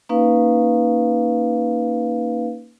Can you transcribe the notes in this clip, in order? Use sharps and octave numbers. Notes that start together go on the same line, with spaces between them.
A#3 C#4 D#4 B4 F5